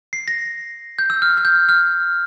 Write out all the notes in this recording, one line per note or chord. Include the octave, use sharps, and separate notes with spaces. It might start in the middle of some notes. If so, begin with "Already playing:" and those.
C7
A#6
G6
E6
F6
F6
G6
F6